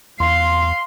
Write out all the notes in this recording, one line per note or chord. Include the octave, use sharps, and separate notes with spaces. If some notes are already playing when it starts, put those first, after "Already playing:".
E2 F5 C6